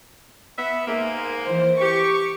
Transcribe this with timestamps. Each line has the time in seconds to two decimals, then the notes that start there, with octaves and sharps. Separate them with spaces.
0.58 B3 E5
0.88 G#2 G#3 A#3
1.41 E3 C5
1.81 G4 C#6